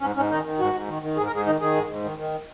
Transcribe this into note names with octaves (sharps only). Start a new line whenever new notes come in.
G#2 C#4
G#2 C#4
D#3 D#4
D#3
G#2 F#4
G#2
D#3
D#3
G#2 G#4
A#4
G#2 G#4
D#3 D#4
D#3 G#4
G#2
G#2
D#3
D#3